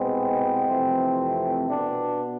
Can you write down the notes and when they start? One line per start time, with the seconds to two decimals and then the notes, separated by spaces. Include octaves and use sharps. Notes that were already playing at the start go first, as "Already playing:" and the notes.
Already playing: C2 B2 G#3 B3 C4
0.69 F2 C3 E3 A3
1.70 B2 B3 D4